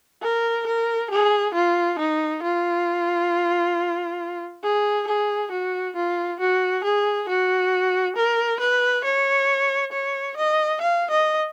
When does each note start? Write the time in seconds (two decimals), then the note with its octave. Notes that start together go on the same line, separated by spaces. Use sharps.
0.22 A#4
0.66 A#4
1.11 G#4
1.54 F4
1.99 D#4
2.42 F4
4.63 G#4
5.08 G#4
5.51 F#4
5.96 F4
6.40 F#4
6.84 G#4
7.28 F#4
8.16 A#4
8.60 B4
9.05 C#5
9.93 C#5
10.37 D#5
10.81 F5
11.11 D#5